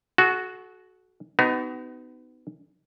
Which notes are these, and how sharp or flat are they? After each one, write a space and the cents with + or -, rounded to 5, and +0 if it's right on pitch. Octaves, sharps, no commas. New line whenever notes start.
F#4 +0 A4 -45
B3 +30 D#4 +0 F#4 +45